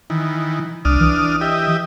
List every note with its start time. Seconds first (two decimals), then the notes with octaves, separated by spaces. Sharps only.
0.10 D#3 E3
0.85 C2 D4 D#6 F6
1.00 E3
1.41 G4 D#5 E5